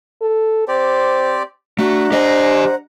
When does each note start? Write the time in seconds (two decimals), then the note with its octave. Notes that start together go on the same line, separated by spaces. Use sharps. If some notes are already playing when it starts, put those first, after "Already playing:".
0.22 A4
0.68 C4 G4 C5 D5
1.79 A3 D4 F#4 F#5 A#5
2.12 G4 C5 D#5